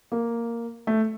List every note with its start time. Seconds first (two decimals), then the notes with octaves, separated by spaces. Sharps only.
0.12 A#3
0.87 A3